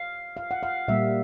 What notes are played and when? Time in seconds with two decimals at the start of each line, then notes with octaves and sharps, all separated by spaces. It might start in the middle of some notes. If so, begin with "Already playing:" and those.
Already playing: F5
0.37 F5
0.51 F#5
0.63 F5
0.88 A#2 G3 A#3 E5